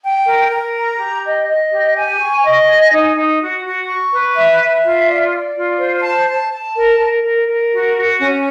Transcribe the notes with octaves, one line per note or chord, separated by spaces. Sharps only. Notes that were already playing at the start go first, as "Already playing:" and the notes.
G5
A#4
A#4
A#5
G4
D#5
D#5
G4
G#5
C#6
D#5
G#5
D#4
D#4
F#4
F#4
C#6
B4
E5
E5
F4
D5
D5
F4
C5
A5
A5
A5
A#4
A#4
A#4
A#4
F#4
F#4
C#4